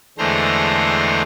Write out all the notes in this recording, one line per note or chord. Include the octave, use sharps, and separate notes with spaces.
E2 D3 G#3 A3 C5 A#5